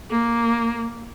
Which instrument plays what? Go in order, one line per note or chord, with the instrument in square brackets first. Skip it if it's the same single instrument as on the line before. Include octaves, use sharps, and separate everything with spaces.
[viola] A#3